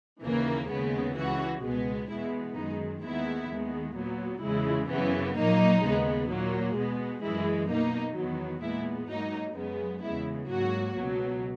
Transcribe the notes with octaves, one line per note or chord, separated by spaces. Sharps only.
D#2 C#3 E3 A#3
D#2 C#3 G#3 B3
C#2 C#3 E3 F#4
C#2 B2 G#3 B3
E2 B2 G#3 B3 E4
F#2 D#3 G#3 D#4
D#2 D#3 G#3 B3 E4
D#2 D#3 G#3 B3
A#2 F#3 B3
E2 C#3 G#3 E4
F#2 C#3 E3 B3
A#2 F#3 A#3 D#4
D#2 C#3 G#3 B3
A#2 F#3 A#3
B2 G#3 B3
F#2 E3 G#3 E4
B2 A#3 D#4
E2 D#3 F#3 B3
A#2 G#3 B3 E4
G#2 F#3 A#3 D#4
F#2 C#3 G#3 B3
E2 C#3 G#3 B3 E4
G#2 F#3 A#3 F#4
C#2 B2 F#3